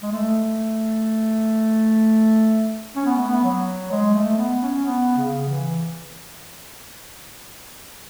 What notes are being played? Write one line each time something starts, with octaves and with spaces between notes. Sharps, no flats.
G#3
A3
C#4
B3
A3
B3
F#3
G#3
A3
B3
C#4
B3
C#3
E3